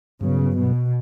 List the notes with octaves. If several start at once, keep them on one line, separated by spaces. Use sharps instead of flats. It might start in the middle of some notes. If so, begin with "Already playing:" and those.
G2 C#3 F#3 B3
B2